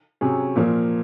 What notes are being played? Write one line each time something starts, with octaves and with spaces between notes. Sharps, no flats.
C3 F#3 C#4 G#4
A#2 F3 A#3